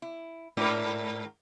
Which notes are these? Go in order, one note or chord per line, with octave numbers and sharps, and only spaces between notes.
E4
G#2 A3 D4 A#4